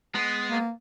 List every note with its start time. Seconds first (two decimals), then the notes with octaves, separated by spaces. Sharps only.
0.15 G#3 B3
0.50 A#3